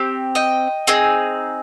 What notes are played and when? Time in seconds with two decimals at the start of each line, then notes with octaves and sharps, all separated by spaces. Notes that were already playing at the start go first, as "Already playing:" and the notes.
Already playing: C4 G4
0.35 D#5 G5
0.87 C4 D#4 G#4